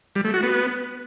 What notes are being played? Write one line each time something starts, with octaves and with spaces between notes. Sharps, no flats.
G3
A3
F#4
B3